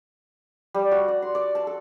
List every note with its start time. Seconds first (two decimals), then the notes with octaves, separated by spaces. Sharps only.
0.74 G3
0.91 F#4
1.08 D5
1.22 C6
1.35 D5
1.55 A5
1.67 A4